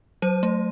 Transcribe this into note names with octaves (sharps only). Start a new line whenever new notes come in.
F#3 C5
A3